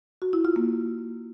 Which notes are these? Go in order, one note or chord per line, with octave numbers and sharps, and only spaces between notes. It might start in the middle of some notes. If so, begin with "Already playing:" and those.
F#4
E4
F4
A#3